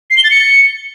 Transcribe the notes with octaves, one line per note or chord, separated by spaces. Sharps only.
C7
G7
A6
C#7